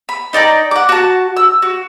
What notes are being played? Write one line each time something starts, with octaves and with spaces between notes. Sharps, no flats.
B5
D#4 D5 G5 A#5
F#5 D6
F#4 A5
E6
F#4